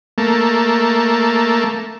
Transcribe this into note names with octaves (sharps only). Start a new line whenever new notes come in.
A3 A#3